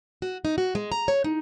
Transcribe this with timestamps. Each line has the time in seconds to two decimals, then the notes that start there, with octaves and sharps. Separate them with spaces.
0.22 F#4
0.45 D#4
0.58 F#4
0.75 G#3
0.92 A#5
1.08 C#5
1.24 D#4